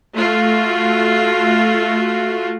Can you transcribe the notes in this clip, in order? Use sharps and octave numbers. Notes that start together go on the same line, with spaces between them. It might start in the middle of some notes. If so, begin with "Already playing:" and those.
A3 F4 F#4